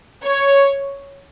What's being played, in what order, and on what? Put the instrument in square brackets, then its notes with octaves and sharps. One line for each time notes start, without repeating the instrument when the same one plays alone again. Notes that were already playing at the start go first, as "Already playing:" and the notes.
[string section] C#5